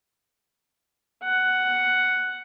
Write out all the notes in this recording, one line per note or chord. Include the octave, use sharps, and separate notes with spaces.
F#5